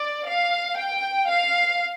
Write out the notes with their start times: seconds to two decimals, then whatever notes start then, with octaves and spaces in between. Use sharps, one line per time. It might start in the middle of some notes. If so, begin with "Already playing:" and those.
Already playing: D5
0.26 F5
0.77 G5
1.27 F5